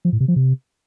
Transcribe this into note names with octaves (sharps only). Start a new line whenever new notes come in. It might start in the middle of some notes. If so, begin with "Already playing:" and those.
F3
A2
C3
F3
C3